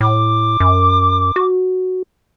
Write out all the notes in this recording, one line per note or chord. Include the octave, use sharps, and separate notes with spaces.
A2 D6
F#2
F#4